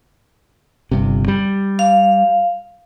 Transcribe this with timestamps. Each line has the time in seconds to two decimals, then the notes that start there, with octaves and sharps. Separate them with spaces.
0.91 G1 G2 C3
1.28 G3
1.79 F5